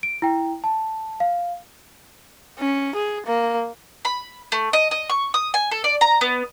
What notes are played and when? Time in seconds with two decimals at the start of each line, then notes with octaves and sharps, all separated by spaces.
0.03 D7
0.22 E4 G5
0.64 A5
1.20 F5
2.59 C#4
2.95 G#4
3.26 A#3
4.05 B5
4.52 A3
4.73 D#5
4.91 D#5
5.10 C#6
5.34 D#6
5.54 G#5
5.71 A4
5.84 D5
6.01 A#5
6.21 B3